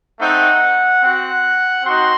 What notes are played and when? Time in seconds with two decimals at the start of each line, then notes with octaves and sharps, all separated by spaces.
0.18 A3 C4 D#4 F#5
1.01 C4 F#4 F#5
1.83 C4 D#4 F#4 C6